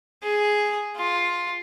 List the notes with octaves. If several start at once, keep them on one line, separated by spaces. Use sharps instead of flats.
G#4
F4